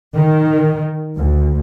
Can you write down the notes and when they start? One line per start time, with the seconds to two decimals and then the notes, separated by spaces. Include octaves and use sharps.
0.15 D#3
1.16 D2